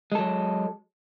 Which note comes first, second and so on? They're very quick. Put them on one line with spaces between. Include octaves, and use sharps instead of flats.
G#3 A4 F#3